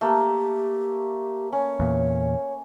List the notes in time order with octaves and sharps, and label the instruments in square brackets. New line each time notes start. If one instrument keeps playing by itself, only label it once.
[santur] A3 A#3 [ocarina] G4
[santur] C#4 [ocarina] C#5
[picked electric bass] E2 A#2